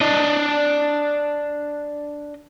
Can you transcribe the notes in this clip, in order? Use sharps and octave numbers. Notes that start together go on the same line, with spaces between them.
D4 D#5